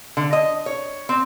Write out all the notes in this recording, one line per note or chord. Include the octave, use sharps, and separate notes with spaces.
D3
D#5
C#5
C4